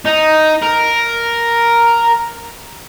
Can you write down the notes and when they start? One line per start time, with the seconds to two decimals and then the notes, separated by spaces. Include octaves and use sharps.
0.05 D#4
0.62 A#4